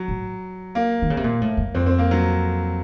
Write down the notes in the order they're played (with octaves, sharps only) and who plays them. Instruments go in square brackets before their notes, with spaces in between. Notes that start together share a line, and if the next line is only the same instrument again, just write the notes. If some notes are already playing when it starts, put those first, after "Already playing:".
Already playing: [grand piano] F#3
[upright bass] A2
[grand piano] A#3
[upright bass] D#3
C#3
C3
A#2
A2
F#2
[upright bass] F2 [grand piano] C4
[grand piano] C4
A#3
F#3